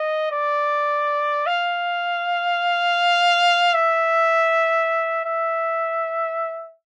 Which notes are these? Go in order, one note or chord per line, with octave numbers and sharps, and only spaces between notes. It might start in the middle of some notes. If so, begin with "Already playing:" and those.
Already playing: D#5
D5
F5
E5
E5